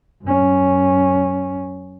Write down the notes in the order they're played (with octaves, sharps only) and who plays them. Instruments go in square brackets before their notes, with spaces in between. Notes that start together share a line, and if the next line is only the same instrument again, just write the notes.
[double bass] F#2 C#4